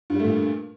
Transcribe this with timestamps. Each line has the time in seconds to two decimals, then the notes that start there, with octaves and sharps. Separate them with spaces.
0.10 G2
0.15 G3
0.20 A3
0.24 A#2